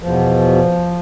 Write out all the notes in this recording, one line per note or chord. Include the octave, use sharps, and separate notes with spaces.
E2 B2 F3